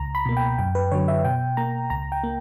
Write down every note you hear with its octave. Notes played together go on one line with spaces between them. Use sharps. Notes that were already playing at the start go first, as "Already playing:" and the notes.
Already playing: C#2 A#5
B5
B2 A#3
G5
F#2 G5
B4
D3 F#3 C#5
E5
B2 G5
A#3 A#5
C#2 A#5
G5
A#3